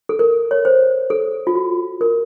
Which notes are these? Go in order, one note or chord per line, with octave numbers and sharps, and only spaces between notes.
A4
A#4
C#5
C5
A4
F4
F#4
A#4